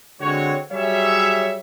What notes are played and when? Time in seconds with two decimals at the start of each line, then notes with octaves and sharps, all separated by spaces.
0.21 D3 G#3 C4 F#4 C#5
0.72 F#3 G3 G#4 C#5 E5